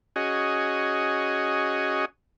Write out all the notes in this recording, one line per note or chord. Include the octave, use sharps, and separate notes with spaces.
C#4 F#4 G#4 D#5